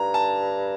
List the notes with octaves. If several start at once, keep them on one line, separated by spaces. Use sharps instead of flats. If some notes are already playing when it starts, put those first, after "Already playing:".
Already playing: G2 A#5
A5